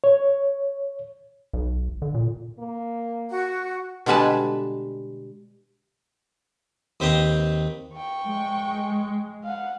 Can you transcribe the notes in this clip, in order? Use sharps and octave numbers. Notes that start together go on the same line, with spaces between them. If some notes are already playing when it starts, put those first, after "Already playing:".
C#5
B1
D3
A#2
A#3
F#4
B2 D3 G3 G#3 B4 A5
D#2 C4 B4 C5 G5 A#5
G5 C#6
G#3
F5 F#5